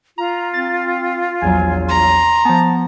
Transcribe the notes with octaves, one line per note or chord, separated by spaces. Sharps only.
F4 A#5
C4 A6
A#1 E2 F#3 G#5
A#5 C6
F3 B3 A5